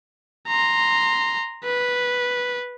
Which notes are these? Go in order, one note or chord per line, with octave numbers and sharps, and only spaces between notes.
A#5 C6
B4